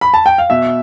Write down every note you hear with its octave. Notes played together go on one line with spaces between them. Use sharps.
B5
A5
G5
F5
B2 E5